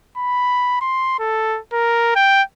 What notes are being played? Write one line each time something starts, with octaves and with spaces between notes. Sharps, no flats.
B5
C6
A4
A#4
G5